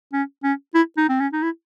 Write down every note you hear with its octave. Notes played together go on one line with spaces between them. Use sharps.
C#4
C#4
E4
D#4
C4
C#4
D#4
E4